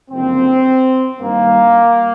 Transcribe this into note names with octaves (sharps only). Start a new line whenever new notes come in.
F#1 F2 D3 C4
G2 D#3 G3 A#3